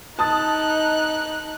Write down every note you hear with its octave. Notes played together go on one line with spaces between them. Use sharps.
D#4 A5 D#6 F#6 A6